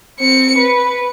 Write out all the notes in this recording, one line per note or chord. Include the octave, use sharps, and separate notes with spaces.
C4 C#7
B4